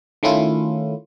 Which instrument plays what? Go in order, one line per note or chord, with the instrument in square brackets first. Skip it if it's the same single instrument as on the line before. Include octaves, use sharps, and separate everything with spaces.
[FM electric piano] D#3 A3 C#4 E4 F4